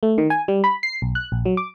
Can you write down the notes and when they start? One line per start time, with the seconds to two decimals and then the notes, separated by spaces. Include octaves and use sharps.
0.03 A3
0.18 D#3
0.30 G#5
0.48 G3
0.64 B5
0.83 C7
1.02 B1
1.15 F#6
1.32 A#1
1.46 F#3
1.57 D6